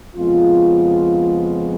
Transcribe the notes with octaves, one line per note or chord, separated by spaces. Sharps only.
F2 C#3 F3 G#3 B3 F4